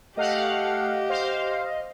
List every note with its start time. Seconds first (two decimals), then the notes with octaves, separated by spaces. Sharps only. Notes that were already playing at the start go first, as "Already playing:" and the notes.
0.17 A3 G4 D#5 F5 F#5
1.09 C5 F5